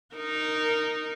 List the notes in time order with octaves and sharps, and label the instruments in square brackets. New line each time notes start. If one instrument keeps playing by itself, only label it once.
[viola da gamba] D#4 A#4